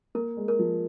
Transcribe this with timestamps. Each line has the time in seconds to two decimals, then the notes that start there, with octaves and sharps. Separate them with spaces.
0.15 A#3 A#4
0.37 G#3
0.48 A#4
0.59 F3